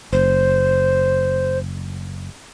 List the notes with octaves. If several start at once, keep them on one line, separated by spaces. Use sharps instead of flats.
F#1 C5